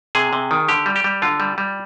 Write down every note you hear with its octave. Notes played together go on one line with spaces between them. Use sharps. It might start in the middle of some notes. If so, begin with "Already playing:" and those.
C3 G#4
C3
D#3
D3 G4
G3
G4
G3
D3 F4
G3
G3